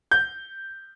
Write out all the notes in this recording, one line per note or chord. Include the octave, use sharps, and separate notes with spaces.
G6